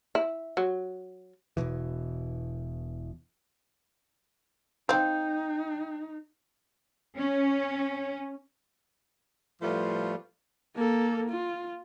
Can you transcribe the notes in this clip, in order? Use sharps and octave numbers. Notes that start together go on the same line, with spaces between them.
E4
F#3
E1 C2 B2 E3
C4 D#4 F5 G5 G6
C#4
A2 F3 G3 A3 B3 F4
A#3 A4
F4